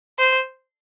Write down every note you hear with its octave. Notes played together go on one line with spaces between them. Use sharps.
C5